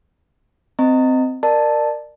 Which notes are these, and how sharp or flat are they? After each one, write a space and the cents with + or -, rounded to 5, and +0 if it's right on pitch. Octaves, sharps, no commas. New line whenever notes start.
C4 -15 D#5 +0 A#5 -30
A#4 +0 D5 +25 A5 +0